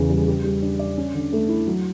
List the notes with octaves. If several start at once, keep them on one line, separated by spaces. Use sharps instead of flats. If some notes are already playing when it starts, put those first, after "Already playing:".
Already playing: E2 C#3 E3
G3
G4
G3
D4
D5
C#4
D3
A3
E4
F#3